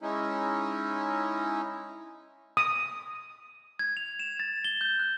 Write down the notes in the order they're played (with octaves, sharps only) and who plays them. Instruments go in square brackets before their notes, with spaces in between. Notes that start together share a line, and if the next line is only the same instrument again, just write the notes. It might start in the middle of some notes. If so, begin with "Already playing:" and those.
[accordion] G#3 C#4 D#4 E4
[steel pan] D#6
[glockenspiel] G#6
F7
E7
A6
G7
G6
F#6